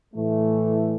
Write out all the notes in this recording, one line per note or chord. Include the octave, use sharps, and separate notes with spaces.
A2 E3 A3